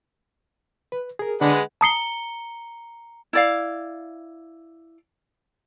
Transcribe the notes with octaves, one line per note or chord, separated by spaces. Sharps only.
B4
G#4 A#4
D3 G#3 D4 B4 F#5
A5 A#5 D#6 C7 C#7 G7
E4 D5 F5